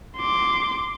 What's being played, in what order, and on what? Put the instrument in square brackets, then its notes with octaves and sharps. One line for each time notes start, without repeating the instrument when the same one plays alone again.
[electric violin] C6 D6